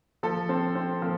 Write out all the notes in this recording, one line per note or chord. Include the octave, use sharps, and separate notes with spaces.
F3 A4
C4
C4
F3